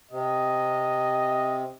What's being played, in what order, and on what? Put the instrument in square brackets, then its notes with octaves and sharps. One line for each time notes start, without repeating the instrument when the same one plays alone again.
[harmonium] C3 [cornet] D#5